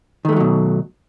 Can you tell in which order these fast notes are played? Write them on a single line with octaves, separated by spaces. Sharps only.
D#3 A3 G#3 F#3 B2